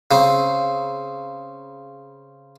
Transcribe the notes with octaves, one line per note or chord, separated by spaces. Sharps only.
C#3 C4